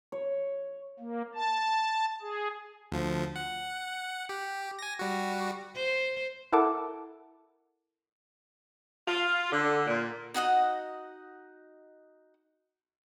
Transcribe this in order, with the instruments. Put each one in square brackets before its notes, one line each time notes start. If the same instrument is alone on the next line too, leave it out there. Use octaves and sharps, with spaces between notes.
[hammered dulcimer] C#5
[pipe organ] A#3
A5
G#4
[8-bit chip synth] D2 F3
F#5
G4
G#5 A#6
G3 F#4
[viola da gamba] C5
[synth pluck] E4 A4 A#4 F#5 A5 D6
[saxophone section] F4
D3
A#2
[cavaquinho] D#4 F#4 D#5 F#5